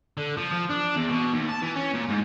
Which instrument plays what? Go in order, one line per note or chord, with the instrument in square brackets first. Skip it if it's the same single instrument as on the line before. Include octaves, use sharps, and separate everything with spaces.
[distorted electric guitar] D3
F3
F3
D4
E2
B2
D#2
A5
E3
C#4
A#2
G#2